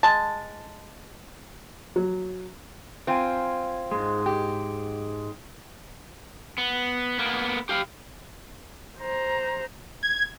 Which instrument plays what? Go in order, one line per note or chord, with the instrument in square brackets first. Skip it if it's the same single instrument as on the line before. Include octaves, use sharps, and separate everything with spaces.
[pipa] G#3 A5
[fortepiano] F#3
[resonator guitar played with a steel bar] C4 F4 [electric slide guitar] G5 G#5
[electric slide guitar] G#2 G#3
[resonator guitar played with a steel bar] G4
[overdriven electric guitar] B3
A#3 B3
G4 F5
[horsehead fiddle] C5 A#5
[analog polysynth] G#6